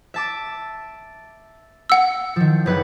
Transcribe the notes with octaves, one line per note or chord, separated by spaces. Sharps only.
E5 A5 D6
F#5 E6
D#3 F3
F#1 B4 F#5